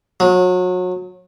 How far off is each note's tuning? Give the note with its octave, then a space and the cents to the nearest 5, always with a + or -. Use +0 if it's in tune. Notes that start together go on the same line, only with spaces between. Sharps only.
F#3 -30